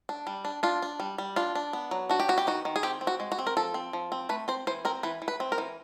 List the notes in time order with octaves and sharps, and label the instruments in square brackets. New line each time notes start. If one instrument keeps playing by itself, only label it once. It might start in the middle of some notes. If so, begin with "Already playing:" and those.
[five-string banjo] D4
G3
D4
D4 F4
D4
G3
G3
D4 F4
D4
B3
F#3
D4 F#4
G4
B3 F#4
G4
D#3 F#4
D#3
G#4
C4 G4
C4
F#4
G#3
F#4
C4
A#4
F3 A4
C4
F3
C4
A3 B4
C4 C5
E3 C5
C4 A#4
E3 B4
E3
B4
C4
A#4
E3